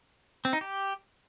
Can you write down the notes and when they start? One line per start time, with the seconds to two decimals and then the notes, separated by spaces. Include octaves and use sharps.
0.45 C4
0.53 D#4
0.61 G4